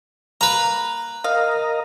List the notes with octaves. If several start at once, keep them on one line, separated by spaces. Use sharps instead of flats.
A#3 B4 A#5
A#4 D#5 F5